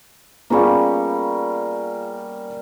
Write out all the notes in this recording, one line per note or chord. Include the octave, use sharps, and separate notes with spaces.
G3 A#3 B3 C#4 F4 G#4 F5 C#6